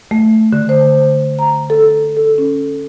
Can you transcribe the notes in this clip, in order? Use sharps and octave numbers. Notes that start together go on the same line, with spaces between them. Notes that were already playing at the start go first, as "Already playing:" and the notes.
A3
D3
C5
A#5
A4
A4
C#4